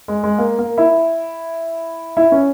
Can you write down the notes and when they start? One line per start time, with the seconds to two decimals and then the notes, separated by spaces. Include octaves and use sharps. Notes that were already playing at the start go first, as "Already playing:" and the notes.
0.08 G#3
0.24 G#3
0.38 A#3
0.59 A#3
0.78 E4
2.17 E4
2.32 C#4